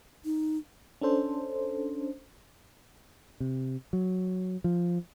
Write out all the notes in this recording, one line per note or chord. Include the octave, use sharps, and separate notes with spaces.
D#4
C#4 D4 A4 C5
C3
F#3
F3